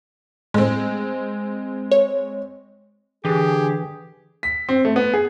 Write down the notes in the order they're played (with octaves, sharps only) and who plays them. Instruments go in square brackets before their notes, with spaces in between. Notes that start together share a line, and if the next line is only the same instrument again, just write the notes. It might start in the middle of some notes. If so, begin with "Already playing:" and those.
[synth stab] A2 [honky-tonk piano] G#3 C4
[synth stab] C#5
[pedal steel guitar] D3 [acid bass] E3 [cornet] G4 [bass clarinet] G#4
[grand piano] B6
C4
A3
B3
G#4